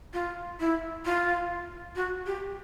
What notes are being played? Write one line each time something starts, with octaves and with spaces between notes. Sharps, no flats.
F4
E4
F4
F#4
G4